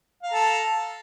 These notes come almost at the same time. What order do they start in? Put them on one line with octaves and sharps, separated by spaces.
F5 A#5 A4